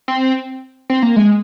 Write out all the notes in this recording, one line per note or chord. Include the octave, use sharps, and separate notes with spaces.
C4
C4
A#3
G#3